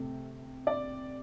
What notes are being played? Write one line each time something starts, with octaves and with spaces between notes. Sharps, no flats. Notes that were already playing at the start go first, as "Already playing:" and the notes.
Already playing: C3 A3 C4
D5